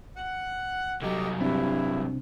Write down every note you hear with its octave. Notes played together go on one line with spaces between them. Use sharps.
F#5
C2 F#3 G4 A4 D#5
G2 C3 C4 D4 E4